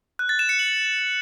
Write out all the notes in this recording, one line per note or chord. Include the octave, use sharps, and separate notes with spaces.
F#6
A6
E7
C#7
F#7